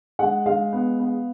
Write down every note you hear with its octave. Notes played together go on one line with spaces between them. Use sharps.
G#3 F#5
G#3 F5
B3
B3